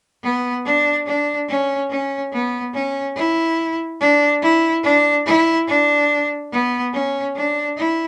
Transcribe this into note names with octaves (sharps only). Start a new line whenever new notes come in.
B3
D4
D4
C#4
C#4
B3
C#4
E4
D4
E4
D4
E4
D4
B3
C#4
D4
E4